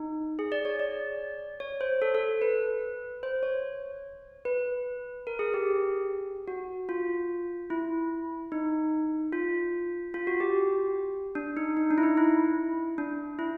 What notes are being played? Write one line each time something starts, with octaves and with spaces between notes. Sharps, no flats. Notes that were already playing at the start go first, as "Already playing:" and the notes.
Already playing: D#4
G#4
D5
C#5
D5
C#5
C5
A4
A4
B4
C5
C#5
B4
A#4
G#4
G4
F#4
F4
E4
D#4
F4
F4
F#4
G4
D4
D#4
D#4
D4
E4
D#4
E4
D4
E4